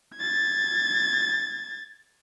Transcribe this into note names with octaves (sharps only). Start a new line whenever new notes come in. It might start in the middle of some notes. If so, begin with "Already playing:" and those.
G#6 A6